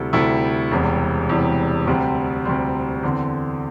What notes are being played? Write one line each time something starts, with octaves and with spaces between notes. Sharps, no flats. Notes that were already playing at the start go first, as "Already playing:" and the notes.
Already playing: D2 C3 G3 E4 A4
D2 C3 G3 E4 A4
E1 E2 C3 G3
E1 E2 C3 G3
D2 C3 G3 C4
D2 C3 G3 C4
E2 D3 C4